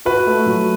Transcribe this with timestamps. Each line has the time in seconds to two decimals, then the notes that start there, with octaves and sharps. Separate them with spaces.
0.05 F#4 B4
0.26 A3
0.46 F#3